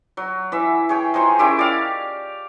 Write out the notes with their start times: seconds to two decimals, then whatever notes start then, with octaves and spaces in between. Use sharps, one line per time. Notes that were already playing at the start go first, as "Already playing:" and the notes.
0.17 F#3
0.52 E3 E5
0.89 G#4 C#5 G5
1.14 F3 D#4 C5 C#5
1.39 D#3 C#4 E4 G4
1.59 D5 F5